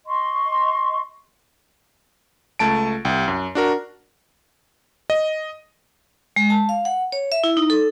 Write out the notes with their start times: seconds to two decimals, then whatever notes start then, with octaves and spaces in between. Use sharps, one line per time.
0.07 D#5 C6 C#6
2.59 C#2 A3 A5 D7
3.05 C2 G5
3.28 F#2
3.55 D4 F#4 A#4
5.10 D#5
6.36 G#3
6.50 A5
6.69 F5
6.85 F#5
7.12 C#5
7.32 E5
7.44 E4
7.57 D#4
7.70 A4